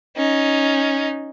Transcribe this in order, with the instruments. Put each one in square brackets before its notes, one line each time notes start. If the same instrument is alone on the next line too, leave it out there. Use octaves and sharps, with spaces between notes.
[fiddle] C#4 D#4